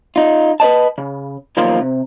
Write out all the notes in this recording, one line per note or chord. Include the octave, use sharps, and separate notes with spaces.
D#4 F4
B4 C5 D#5 A5
C#3
B1 D#3 F3 A#3 F4 C6
C3